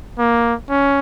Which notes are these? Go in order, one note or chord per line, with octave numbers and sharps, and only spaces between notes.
A#3
C#4